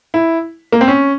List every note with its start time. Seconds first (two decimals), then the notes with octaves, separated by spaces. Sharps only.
0.14 E4
0.72 A#3
0.81 C4
0.88 C#4